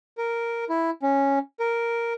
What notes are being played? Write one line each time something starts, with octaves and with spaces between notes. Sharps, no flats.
A#4
E4
C#4
A#4